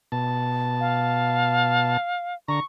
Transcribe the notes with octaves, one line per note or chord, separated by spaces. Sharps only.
B2 A5
F5
D3 A#5 C#6